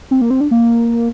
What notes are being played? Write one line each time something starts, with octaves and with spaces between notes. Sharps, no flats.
C4
A#3
C4
D4
A#3